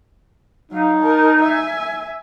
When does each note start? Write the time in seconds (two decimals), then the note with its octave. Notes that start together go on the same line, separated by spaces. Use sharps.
0.71 F#3 D#4 F5
1.00 A#4 A5
1.41 E5 G#5